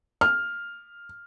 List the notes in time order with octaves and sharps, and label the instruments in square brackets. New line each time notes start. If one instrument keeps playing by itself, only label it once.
[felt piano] F6